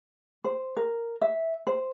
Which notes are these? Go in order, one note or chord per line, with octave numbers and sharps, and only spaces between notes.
C5
A#4
E5
C5